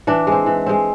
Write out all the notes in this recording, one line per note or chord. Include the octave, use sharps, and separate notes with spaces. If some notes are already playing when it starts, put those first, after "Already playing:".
E3 D4
G#3 C4
E3
G#3 C4